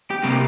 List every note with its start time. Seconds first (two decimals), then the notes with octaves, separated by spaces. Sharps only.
0.10 G4
0.23 C3 G3 A#3 G4